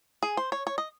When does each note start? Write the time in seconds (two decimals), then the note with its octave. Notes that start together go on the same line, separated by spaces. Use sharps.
0.23 G#4
0.37 C5
0.52 C#5
0.67 C#5
0.78 D#5